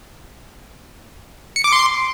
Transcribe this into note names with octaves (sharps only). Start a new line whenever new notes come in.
C#7
D6
C6